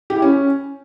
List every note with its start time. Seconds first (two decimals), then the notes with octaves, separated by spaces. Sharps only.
0.10 G4
0.16 E4
0.22 C#4